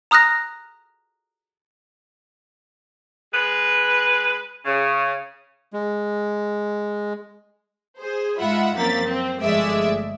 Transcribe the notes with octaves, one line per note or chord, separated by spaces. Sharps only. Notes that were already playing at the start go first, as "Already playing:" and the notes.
A#5 D#6 F6 F#6 A#6
G#3 B4
C#3
G#3
G#4 C5
G#2 G#3 F4 E5 F#5 B5
F#2 F3 A#3 C4 A6 B6
C4
G1 F3 G#3 A3 D5 E5